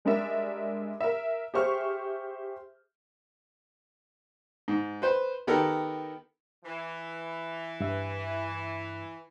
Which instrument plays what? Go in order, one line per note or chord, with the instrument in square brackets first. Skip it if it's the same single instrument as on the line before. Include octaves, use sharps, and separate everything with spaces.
[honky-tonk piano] G3 G#3 D4 A#4 D5 E5
A#4 E5
G4 G#4 C5 E5 C#6 F6
[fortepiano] G#2
B4 C5
D#3 B3 G4 A4 A#4
[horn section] E3
[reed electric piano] G2 E5